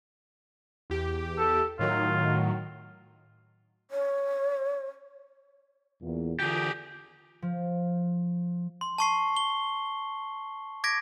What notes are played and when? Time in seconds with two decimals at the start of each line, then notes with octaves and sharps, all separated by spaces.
0.90 E2 G4
1.38 A4
1.79 A2 D#3 F#3 F4
3.91 C#5
6.02 E2 A#2
6.40 D3 E3 F4 G4 G#4
7.42 F3
8.81 C6
8.98 A5 C#6 C7
9.37 G7
10.84 D6 G#6 A#6 B6 D7